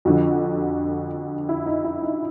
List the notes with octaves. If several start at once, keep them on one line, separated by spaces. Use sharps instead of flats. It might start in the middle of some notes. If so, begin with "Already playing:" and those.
F2 D3 F3 F#4
E4
D#4
E4
D#4